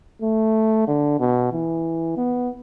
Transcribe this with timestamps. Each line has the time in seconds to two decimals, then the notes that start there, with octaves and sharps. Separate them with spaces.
0.22 A3
0.87 D3
1.19 B2
1.52 E3
2.16 B3